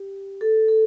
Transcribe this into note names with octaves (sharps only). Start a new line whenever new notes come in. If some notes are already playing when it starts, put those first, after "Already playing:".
Already playing: G4
A4
A4